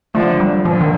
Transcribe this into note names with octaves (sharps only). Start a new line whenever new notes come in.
D3 F3 A3
G3
A#2 D3 F3
D#3